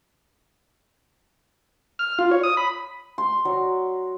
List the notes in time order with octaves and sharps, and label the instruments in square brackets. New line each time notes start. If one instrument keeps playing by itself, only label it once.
[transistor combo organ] F6
F4
C#5
D#6
B5
[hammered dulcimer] C6
F#3